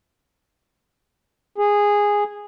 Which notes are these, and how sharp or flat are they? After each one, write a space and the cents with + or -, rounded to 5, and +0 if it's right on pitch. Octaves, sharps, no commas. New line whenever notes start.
G#4 -10